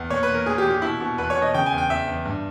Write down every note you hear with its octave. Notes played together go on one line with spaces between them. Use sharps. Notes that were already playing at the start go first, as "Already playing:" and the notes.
Already playing: E2
A#2 C#5
B4
A#2
A#4
A#2 G#4
G4
A#2
G4
B2 E4
B2
E2 B4
C#5
B2
D#5
C#3 G5
G#5
E2
G5
E2 E5
E2
G2